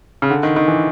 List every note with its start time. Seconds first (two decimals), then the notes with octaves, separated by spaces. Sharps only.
0.22 C#3
0.30 D3
0.43 D#3
0.56 D#3
0.68 E3